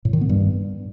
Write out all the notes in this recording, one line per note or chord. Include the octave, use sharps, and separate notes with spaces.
A2
D#3
B3
G2